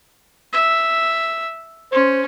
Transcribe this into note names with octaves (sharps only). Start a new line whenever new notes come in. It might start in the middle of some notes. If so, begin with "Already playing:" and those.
E5
C#4 C5